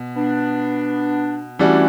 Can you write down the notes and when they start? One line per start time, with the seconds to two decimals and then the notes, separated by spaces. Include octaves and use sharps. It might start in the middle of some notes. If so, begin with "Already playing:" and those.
Already playing: B2
0.16 B3 D4
1.59 E3 G3 A3 C#4 D4 F#4